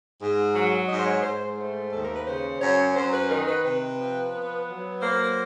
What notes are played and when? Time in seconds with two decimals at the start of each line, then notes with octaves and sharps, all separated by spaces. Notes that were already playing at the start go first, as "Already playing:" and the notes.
0.20 G#2
0.54 F#3
0.89 G#2 D#5
0.97 C5
1.06 C#5
1.23 G#2 C5
1.41 C5
1.58 A3
1.92 D#2 A4
2.04 A#4
2.15 B4
2.26 C#3 C5
2.61 F#2 C#5
2.95 F#2 C5
3.13 B4
3.30 D#3 A#4
3.48 B4
3.64 C3 B4
3.99 F3
4.34 B3
4.68 F#3
5.02 A#3 C5